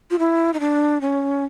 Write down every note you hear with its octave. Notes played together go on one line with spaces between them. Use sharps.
F4
E4
D#4
D4
C#4